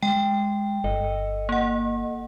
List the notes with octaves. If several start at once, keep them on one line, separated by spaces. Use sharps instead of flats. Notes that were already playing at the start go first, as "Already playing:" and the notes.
G#3 G5
G1 A4 D#5
A#3 F#5